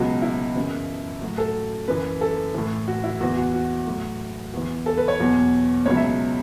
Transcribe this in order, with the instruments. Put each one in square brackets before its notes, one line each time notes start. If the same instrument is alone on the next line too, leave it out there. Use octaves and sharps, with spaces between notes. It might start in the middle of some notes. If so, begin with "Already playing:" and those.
Already playing: [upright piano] C#2 B2 F#3 F#4
E4
F#2 C#3 E3
A2 F#3 F#4
A4
F#2 E3 B4
A4
A2 E3
F#4
E4
E2 E3 F#4
F#4
F#4
A2 F#3
E2 E3
A4
B4
C#5
E2 B2 F#3
C#2 B2 F#3 C#5
E5